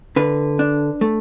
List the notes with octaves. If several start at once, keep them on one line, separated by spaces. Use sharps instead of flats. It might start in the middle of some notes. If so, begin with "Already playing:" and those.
D3 B4
D4
A3